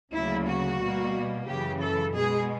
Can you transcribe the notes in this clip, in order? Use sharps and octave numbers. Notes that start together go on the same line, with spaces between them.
D2 C#3 F#3 A#3 E4
F#4
B2 G3 A#3
F#2 C#3 E3 G4
A4
B2 G#3 G#4